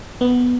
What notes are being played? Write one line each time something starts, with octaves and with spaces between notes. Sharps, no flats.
B3